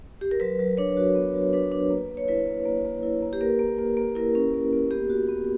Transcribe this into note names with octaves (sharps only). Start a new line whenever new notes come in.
G4
A#4
F#3 B4
F#3
D4 C#5
F#4
B3
F#3
D4 B4
D4
A#3
A#3
C#5
E4 B4
A#3
A#3
A#3
E4
A#3
G4
A#3 A#4
A#3
A#3
A#3
E4 A#4
C#4
A#3
A#3
B3 G4
F#4
B3